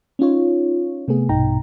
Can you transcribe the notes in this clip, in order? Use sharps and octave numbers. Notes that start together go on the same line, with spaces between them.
C#4 D#4 F4 C#5
C3 A3 B3 G#4
A#1 G2 B2 D#4 G5 A#5